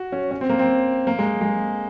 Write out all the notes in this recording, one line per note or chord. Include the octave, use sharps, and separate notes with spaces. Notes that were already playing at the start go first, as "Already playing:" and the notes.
Already playing: F#4
C#4
C#4
C4
A#3
C4
A#3
G#3
G#3